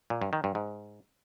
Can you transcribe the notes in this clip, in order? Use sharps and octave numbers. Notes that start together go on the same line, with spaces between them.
A#2
G2
D#3
G2
G#2